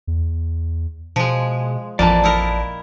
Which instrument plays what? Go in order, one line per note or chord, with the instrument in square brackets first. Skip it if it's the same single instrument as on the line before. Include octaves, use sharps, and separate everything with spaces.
[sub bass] E2
[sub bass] B2 [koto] F3 G#3
[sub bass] A1 [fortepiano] F2 [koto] A#2 E3 A#3 [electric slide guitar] D5 A5
[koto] D#4 E4 A#4